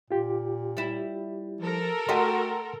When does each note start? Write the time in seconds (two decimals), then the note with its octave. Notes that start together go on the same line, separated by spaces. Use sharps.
0.11 A#2 F4 G4
0.77 G3 E4
1.61 F3 A4 A#4
2.09 A3 F#4 G4 D#5 F#5 A#5 C6